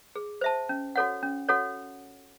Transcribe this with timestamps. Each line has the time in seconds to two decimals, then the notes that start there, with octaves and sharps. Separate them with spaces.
0.15 G#4
0.41 C5 E5 A5
0.69 C#4
0.96 F#4 A4 C#5 F#5
1.23 C#4
1.49 F#4 A4 C#5 F#5